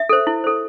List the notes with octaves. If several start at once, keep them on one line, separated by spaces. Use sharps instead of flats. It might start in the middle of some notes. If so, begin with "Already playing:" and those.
Already playing: E5
A4 C5
E4
A4 C5